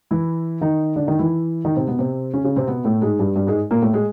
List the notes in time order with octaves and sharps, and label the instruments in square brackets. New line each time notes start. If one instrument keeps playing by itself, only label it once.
[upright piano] E3 E4
D#3 D#4
D3 D4
D#3 D#4
E3 E4
D#3 D#4
C3 C4
B2 B3
C3 C4
C#3 C#4
C#3 C#4
C3 C4
B2 B3
A2 A3
G#2 G#3
G2 G3
G2 G3
G#2 G#3
A#2 A#3
A2 A3
G#3